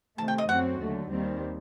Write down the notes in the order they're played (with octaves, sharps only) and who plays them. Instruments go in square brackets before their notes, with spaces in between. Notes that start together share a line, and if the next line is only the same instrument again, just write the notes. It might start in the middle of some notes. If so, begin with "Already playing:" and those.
[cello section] C3 D#3 A3 C4 [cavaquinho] A5
[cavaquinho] G5
D#5
[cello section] F#2 F#3 A3 C4 F#4 [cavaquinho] F#5
[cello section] D#2 D3 F#3 A3
D#2 D#3 G3 C4